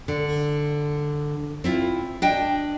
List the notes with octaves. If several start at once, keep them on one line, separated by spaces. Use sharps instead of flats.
D3
C4 E4 F4
D4 D#5 G5